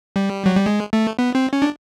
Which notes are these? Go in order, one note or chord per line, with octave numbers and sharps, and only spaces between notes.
G3
F#3
G3
G#3
A3
B3
C4
C#4
D4